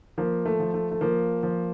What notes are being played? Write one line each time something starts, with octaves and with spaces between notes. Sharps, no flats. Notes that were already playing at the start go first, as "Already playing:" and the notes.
F3 A#3
A3
F3
A3
A3
F3 A#3
F3